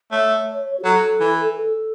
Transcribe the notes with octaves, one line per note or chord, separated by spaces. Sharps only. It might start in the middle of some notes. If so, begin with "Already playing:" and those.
A3 C#5
F#4
F#3 A4
E3
A4